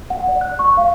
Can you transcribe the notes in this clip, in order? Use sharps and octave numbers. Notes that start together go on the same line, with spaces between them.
F#5
D5
F#6
C#6
F5